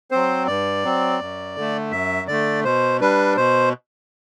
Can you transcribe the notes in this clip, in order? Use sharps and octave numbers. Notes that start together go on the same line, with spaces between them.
F#3 C4 C5
G2 D5
F#3 C4
F#2
D3 A3
F#2 E5
D3 A3 D5
B2 C5
G3 D4 B4
B2 C5